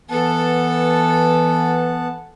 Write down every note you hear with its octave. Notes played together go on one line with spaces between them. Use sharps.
E3 B3 A4 F#5 A5